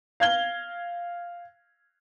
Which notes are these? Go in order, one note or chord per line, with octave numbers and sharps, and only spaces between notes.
F5 G#6 G7